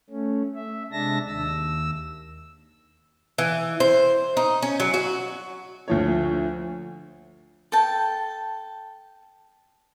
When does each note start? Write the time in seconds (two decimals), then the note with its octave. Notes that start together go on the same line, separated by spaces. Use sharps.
0.10 A3 C#4
0.55 E5
0.92 C3 G#3 D4 E5 A5 A#6
1.27 D#2 E6
3.38 E3
3.80 C5
4.37 D#4
4.62 C#4
4.80 F#3
4.94 F#4
5.88 D2 F3 C#5
7.72 A4 G5 A5